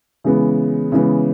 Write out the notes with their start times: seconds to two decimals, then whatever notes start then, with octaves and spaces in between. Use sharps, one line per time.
0.24 C#3 E3 G#3 B3
0.92 C#3 E3 G#3 B3